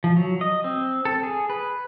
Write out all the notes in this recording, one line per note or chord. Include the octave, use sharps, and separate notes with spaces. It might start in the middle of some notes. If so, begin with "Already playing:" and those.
F3
F#3
D#5
C4
A4
G#4
B4